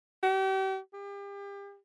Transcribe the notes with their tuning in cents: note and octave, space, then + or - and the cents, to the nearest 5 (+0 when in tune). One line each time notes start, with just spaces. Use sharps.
G4 -40
G4 +35